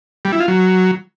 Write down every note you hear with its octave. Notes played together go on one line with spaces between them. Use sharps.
G3
E4
F4
F#3